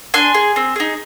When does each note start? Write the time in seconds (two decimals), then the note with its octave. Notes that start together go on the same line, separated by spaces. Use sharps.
0.14 D4 G#5 C6
0.34 G#4
0.56 C4
0.76 D#4 G#4